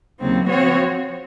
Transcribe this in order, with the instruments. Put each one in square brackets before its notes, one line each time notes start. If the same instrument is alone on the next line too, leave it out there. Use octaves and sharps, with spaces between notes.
[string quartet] D#2 C#3 F#3 C4
F3 C4 F#4 C#5